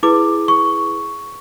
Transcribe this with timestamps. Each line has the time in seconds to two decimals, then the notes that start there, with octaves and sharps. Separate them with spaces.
0.03 E4 G#4 B4 D6
0.48 C#6